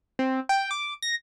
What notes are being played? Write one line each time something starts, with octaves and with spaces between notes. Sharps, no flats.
C4
G5
D6
A#6